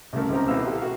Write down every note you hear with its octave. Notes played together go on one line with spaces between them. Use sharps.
C2 C#3 A3 A#4
C#2 C#3 C4 A#5
B1 B2 B3 E4 F5 E6
E4 G4 A4
F#4 F5